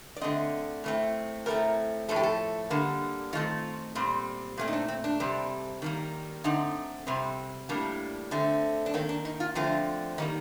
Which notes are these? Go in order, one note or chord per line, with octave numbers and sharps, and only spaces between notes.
D5
D3 A3 C4 D#5
A2 A3 C4
A2 A3 C4 A#4
A2 F3 A3 A4
G4
A4
D3 G3 A#3
D#3 A3 C4 F4
A#2 G3 C4
A#2 A3 C4
D#4
D4
C4
D4
C3 G3 C4
D#3 G3 A#3
D3 A3 C4 D#4
C3 G3 C4
A2 G3 A#3 D4
D3 A3 C4
D4
D#3 A#3 C4
D4
D#4
F4
D3 F3 A3 C4 F4
D#3 G3 A#3 D#4